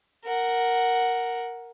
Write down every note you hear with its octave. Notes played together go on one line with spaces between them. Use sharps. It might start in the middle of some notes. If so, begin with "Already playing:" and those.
A#4 F#5